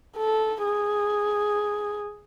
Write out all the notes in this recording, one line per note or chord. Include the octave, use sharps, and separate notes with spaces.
A4
G#4